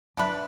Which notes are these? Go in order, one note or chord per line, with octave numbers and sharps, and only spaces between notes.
D3 F#3 A3 D4 B4